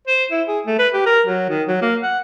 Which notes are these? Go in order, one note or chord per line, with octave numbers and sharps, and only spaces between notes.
C5
E4
G#4
A3
B4
G4
A#4
F#3
D#3
F#3
A#3
F#5